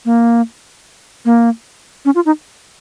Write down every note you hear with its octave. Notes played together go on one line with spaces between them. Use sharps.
A#3
A#3
C#4
F4
D#4